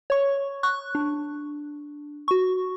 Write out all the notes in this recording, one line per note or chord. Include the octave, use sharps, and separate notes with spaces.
C#5 C#6
C#6 F#6
D4
F#4 C#6